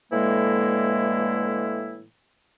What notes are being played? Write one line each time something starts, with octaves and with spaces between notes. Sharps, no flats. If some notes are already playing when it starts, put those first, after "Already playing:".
A2 D3 E3 G#3 A#3 E4